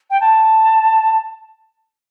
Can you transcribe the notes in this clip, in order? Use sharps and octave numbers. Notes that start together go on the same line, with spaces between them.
G5
A5